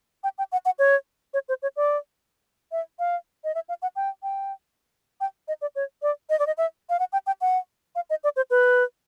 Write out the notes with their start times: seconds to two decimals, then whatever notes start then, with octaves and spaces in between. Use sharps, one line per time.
0.24 G5
0.38 G5
0.52 F#5
0.66 F#5
0.79 C#5
1.34 C#5
1.49 C5
1.62 C#5
1.76 D5
2.72 E5
2.99 F5
3.44 D#5
3.55 E5
3.69 F5
3.82 F#5
3.96 G5
4.23 G5
5.21 G5
5.48 D#5
5.62 D5
5.76 C#5
6.02 D5
6.30 D#5
6.39 D5
6.47 D#5
6.58 E5
6.90 F5
6.99 F#5
7.13 G5
7.27 G5
7.41 F#5
7.95 F5
8.10 D#5
8.24 D5
8.36 C5
8.51 B4